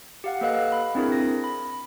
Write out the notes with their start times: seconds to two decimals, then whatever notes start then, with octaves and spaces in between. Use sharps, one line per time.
0.24 G4 F5 F#5
0.41 A#3 A4 B4 D#5 F5 F#6
0.72 B5
0.95 C4 D4 E4 G#4 A#4
1.12 A#6
1.44 B5